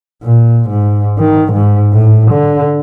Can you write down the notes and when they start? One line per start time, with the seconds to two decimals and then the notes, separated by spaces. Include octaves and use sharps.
0.24 A#2
0.70 G#2
1.19 D#3
1.53 G#2
1.93 A2
2.31 D3